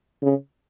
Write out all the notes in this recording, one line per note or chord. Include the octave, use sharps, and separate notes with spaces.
C#3